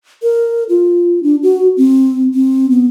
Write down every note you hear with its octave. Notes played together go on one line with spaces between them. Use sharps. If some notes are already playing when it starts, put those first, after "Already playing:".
A#4
F4
D4
F#4
C4
C4
B3